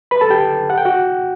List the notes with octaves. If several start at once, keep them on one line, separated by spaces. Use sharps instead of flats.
B4 B5
A4 A5
G4 G5
F#5
G5
F#4 F#5